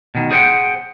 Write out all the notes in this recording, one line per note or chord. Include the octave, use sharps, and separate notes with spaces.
B2 D#3
G#4 C5 D5 F#5 G5